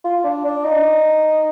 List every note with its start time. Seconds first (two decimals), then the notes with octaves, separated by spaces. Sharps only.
0.04 F4
0.24 D4
0.45 D4
0.64 D#4